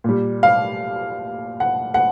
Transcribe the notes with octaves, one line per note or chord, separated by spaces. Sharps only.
A#2 G3
F5
F#5
F#5